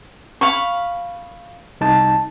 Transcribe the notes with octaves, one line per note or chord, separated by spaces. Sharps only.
F5 B5 C#6
C2 D#4 A5